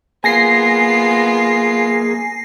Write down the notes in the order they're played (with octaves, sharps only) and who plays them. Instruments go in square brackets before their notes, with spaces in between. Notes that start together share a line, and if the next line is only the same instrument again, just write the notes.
[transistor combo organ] A#3 G#4 [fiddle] B3 F4 [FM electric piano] G#5 A#6 C7